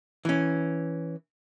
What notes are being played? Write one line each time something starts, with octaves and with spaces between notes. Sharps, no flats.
E3 C#4